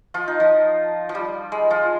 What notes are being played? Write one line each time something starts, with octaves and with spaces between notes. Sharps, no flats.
F3 F4
D#4
F3
F3
G3
G#3
F3 F4